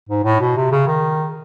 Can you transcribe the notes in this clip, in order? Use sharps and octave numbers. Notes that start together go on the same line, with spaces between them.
G#2
A2
B2
C3
C#3
D#3